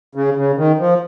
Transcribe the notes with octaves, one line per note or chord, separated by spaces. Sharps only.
C#3
C#3
D#3
F3